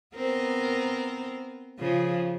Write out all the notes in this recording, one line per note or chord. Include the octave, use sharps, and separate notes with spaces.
B3 C4 A#4
C#3 F3